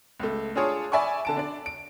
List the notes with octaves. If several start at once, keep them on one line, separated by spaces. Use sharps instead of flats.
C#2 A3
D4 F4 G#4 C#5 D5 A5
D5 E5 G#5 B5 C#6
D3 A5 D7
D4 D5
D7